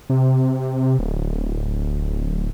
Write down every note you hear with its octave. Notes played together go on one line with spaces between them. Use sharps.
C3
D1